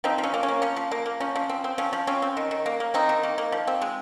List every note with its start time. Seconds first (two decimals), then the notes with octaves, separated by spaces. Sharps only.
0.04 F3 C4 D#4
0.18 F3
0.24 C#4
0.34 A#3
0.43 C#4
0.48 A#3
0.62 F3 C#4
0.76 F3
0.91 A#3
1.06 A#3
1.20 F3 C#4
1.36 F3
1.49 C4
1.64 C4
1.78 F3 C#4
1.93 F3
2.07 C4 C#4
2.22 C4
2.37 D#3
2.51 D#3
2.66 A#3
2.80 A#3
2.94 D#3 C4 D#4
3.09 D#3
3.23 A#3
3.38 A#3
3.52 F3
3.67 C4
3.82 G#3